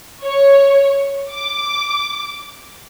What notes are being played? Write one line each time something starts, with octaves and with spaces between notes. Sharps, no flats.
C#5
D6